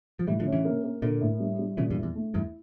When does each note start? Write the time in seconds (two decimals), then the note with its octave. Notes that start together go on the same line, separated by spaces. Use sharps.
0.19 F3
0.27 A2 E3 G3
0.39 D3 F3
0.46 C#4
0.52 C#3 E3
0.65 A#3
0.84 A#3
1.02 A#2 D3 A#3
1.21 A2
1.40 G3
1.59 G3
1.77 A#2 C#3 E3
1.90 E2 G2
1.96 E4
2.03 E2
2.15 A3
2.34 E2 G2 E4